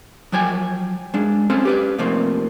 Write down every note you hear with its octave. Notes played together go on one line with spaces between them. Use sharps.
F3 F#3 G5 G#5
G#3 D4
C4 C#4 A4 C5 F5
G4 B4 D5
C3 F3 A3 A#3 C4